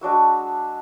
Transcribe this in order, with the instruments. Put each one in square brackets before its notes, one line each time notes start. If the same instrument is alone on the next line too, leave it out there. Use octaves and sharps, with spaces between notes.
[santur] G#3 D4 F#4 E6